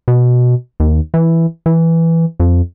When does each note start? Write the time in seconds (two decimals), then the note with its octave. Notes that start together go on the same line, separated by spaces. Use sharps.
0.08 B2
0.80 D#2
1.14 E3
1.66 E3
2.40 F2